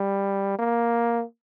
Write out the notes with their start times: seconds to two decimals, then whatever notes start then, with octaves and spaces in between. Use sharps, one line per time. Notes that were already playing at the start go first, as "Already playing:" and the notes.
Already playing: G3
0.59 A#3